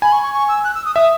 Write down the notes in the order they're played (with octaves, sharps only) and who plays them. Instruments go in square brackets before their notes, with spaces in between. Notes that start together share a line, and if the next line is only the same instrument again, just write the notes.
[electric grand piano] G#5 [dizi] B5
[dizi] C#6
C#6
C#6
E6
F#6
E6
D#6
[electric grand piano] E5 [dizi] D#6